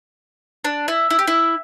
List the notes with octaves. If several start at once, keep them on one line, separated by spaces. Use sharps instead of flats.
D4
E4
E4
G4
E4